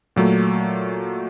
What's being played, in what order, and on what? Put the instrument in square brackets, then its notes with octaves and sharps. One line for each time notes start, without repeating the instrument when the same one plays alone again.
[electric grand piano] A#2 F#3 A3